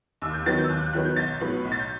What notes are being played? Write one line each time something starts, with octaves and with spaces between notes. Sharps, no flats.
D#2 E6
G6
D#3 F#3 B3 A6
G6
E6
D#2 F#6
F#6
D#3 F#3 B3 F#6
G6
B1 A6
A2 F#3 B3
B1
A6
G6